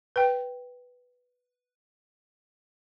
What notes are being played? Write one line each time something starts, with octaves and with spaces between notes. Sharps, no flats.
B4 G5